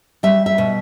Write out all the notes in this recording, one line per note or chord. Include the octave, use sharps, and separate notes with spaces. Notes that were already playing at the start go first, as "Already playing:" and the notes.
G3 E5
E5
B2